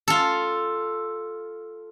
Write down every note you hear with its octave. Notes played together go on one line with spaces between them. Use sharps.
F4 A4